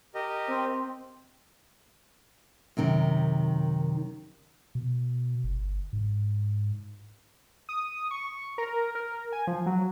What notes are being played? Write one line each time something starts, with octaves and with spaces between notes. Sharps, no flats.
G4 A#4 D#5
C4
F#2 C3 D#3
B2
G1
G#2
D#6
C#6
A#4
A#4
G#5
F3
F#3